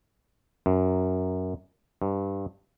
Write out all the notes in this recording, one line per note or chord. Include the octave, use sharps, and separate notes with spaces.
F#2
G2